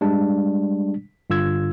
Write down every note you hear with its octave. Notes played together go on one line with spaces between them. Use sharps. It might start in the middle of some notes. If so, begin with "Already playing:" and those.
G3 G#3 D4
G2 D3 F4 E6 G#6